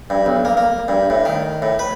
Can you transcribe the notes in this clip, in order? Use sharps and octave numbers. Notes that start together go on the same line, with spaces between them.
G2
B1
A#3
A#3
G2
A2
D#3
A2
B4